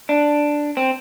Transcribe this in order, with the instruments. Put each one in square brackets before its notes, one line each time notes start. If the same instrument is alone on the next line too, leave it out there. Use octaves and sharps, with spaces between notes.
[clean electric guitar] D4
C4